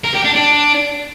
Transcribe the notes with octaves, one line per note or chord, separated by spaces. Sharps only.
A#4
G4
D4
D4